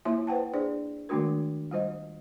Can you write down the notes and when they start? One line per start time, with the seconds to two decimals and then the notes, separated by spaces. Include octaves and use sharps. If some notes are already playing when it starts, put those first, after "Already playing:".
0.05 A#3 E4 F4 C#5 E5 C6
0.27 B4 C5 F#5 G5 A5
0.53 D4 G#4 C5 D5
1.09 D#3 G#3 A3 D4 F#4 A#4
1.71 G3 F4 C5 D#5